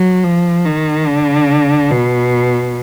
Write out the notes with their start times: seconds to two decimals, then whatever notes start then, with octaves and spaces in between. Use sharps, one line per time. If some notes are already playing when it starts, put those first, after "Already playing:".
Already playing: F#3
0.24 F3
0.65 D#3
1.07 D3
1.91 B2